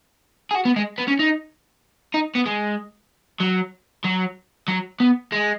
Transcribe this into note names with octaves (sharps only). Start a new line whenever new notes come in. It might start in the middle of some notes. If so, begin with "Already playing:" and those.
G#4
F#4
B3
G#3
B3
C#4
D#4
D#4
B3
G#3
F#3
F#3
F#3
B3
G#3